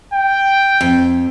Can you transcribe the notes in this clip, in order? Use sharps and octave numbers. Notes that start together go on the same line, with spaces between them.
G5
F2